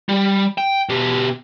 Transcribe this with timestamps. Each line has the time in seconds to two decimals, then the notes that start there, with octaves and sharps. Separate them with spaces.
0.09 G3
0.58 G5
0.89 B2 G4